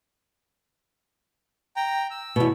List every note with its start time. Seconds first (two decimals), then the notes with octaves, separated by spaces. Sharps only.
1.76 G5 A#5
2.11 E6
2.36 E2 B2